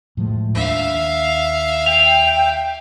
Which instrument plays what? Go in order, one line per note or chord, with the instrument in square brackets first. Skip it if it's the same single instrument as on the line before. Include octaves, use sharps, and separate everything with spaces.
[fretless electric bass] A2 F3 G#3
[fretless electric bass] D#2 D4 [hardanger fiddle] E5 F5
[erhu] G5 [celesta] F7